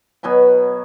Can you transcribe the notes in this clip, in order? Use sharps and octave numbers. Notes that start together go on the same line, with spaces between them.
B2 F#3 G#5 B5